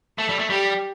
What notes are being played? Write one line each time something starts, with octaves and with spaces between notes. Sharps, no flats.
A3 A4
G3
A3
G3 G4